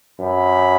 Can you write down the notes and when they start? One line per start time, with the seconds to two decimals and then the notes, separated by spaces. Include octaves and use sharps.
0.20 F#2 B5